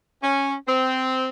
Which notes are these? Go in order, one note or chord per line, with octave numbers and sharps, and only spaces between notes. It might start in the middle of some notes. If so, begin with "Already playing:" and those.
C#4
C4